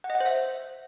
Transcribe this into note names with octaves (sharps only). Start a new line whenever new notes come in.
F#5
D#5
F#5
C5
E5